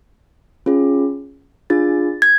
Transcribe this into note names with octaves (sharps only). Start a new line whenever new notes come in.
C#4 F4 G#4
D4 F4 G#4 A6
G#6